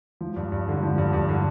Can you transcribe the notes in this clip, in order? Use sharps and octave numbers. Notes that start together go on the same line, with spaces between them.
F3
G2
G2
D3
F3
G2
G2
D3